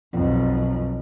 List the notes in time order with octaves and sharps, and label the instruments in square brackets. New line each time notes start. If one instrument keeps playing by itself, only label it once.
[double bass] B1 F2